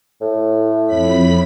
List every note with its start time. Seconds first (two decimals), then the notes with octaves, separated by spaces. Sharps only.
0.21 A2
0.87 F2 B5 B6